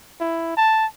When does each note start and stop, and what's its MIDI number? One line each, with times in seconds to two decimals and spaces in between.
0.20 0.53 64
0.57 0.86 81